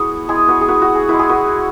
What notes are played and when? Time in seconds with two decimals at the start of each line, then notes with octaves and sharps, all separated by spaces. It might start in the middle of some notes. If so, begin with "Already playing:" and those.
Already playing: B3 E4 F#4 G#4
0.28 G#3 E4 G#4
0.48 F#4 B4
0.61 G#4
0.68 F#4 B4
0.82 F#4
0.95 G#4
1.09 G#3 E4 B4
1.19 G#4
1.29 F#4 B4